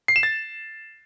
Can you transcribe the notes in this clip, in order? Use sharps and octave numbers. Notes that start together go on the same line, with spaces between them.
C7
E7
A6